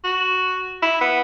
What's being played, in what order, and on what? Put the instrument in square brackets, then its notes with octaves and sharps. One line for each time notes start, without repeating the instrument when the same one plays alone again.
[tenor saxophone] F#4
E4
B3